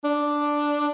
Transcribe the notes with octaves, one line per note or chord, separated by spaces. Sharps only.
D4